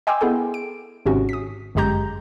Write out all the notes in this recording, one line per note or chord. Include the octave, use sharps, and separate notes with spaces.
D#5 G5 G#5 C6 D6 E6
B3 E4 G#4 A4 G5
D7
G#1 G#2 C3 C#4 F#4
D#6 B6
G1 F#2 G#3 G4 A#5 G6